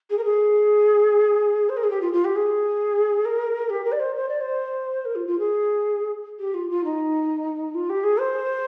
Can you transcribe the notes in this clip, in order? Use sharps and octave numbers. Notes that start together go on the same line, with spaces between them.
G#4
A#4
G#4
C5
A#4
G#4
G4
F4
F4
G4
G#4
A#4
G4
A#4
D5
C5
C5
D5
C5
A#4
F4
F4
G#4
G4
F4
F4
D#4
F4
G4
G#4
C5